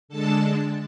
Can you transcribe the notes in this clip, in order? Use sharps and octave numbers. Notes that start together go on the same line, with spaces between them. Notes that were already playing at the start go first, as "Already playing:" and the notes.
D3 G#3 D4 A4 A5